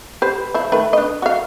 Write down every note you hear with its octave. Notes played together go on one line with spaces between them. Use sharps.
G4 B4 C5
F3 E4
D#3 A3 B4
D4 D#5
F#4 F5